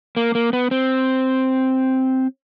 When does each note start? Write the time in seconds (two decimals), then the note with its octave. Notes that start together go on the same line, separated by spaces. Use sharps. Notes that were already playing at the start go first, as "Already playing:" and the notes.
0.17 A#3
0.35 A#3
0.53 B3
0.71 C4